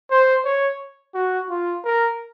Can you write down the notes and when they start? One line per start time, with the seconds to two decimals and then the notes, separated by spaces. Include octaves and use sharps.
0.11 C5
0.45 C#5
1.15 F#4
1.50 F4
1.85 A#4